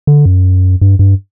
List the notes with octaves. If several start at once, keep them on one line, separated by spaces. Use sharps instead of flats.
D3
F#2
G2
G2